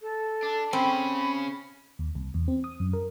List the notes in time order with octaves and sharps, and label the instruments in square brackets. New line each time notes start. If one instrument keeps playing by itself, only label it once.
[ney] A4
[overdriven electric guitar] D4
[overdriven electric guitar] C#3 C#4 [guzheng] C4 [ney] B5
[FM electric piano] D#2
C2
E2
C4
D#6
F#2
A#4